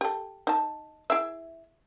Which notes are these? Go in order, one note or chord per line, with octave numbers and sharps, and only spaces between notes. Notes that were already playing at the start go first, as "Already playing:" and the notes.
G4 A4
D#4 A5
E4 G#4 E5